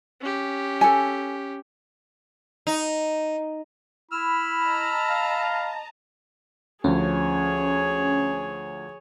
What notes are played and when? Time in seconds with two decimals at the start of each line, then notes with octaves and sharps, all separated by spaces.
0.21 C#4 G4
0.81 A4 G#5
2.67 D#4
4.11 E4 B5 E6 F6
4.62 D#5 A5 A#5
5.10 F5
6.84 D2 F3 C#4 G#4 C#5